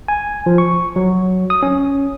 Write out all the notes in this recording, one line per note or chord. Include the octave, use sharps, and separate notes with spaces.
G#5
F3
C#6
F#3
D#6
C#4